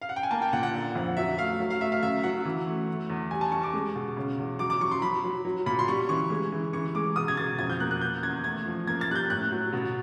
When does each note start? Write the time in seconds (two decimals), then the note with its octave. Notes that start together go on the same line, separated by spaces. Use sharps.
0.02 F5
0.09 F#5
0.16 G5
0.23 G#5
0.31 A#3 A5
0.42 G5
0.53 A#2 F#5
0.63 F#5
0.74 D3
0.95 F2
1.17 F#3 E5
1.38 A3 F5
1.60 F#3
1.70 F5
1.81 A3 E5
1.92 F5
2.03 F#2 E5
2.23 F#3 F#5
2.45 E3
2.67 A3
2.88 A3
3.10 E2
3.31 G3 G#5
3.41 A5
3.52 G3 C#6
3.63 D6
3.74 G#3
3.95 B2
4.17 C#3
4.38 E2
4.59 F#3 D6
4.70 D6
4.80 F#3 C#6
4.91 C6
5.02 F#3 B5
5.24 F#3
5.45 F#3
5.66 A#2 B5
5.79 C6
5.88 G3 C#6
6.09 E3 C#6
6.30 G#3
6.52 E3
6.73 E3 C#6
6.95 G#3 D6
7.16 B2 D#6
7.28 G#6
7.37 B2 A6
7.59 F2 G#6
7.70 G6
7.80 A#3 F#6
7.91 F#6
8.01 B3 G6
8.23 E2 G#6
8.44 A3 G#6
8.65 F3
8.87 A#3 G#6
9.01 A6
9.09 G3 F#6
9.15 G6
9.30 A2 F#6
9.51 F#3
9.73 B2